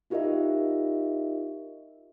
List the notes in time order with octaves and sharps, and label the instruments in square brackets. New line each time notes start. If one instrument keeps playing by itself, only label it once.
[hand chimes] D#4 F4 G4 A#4 D#5 E5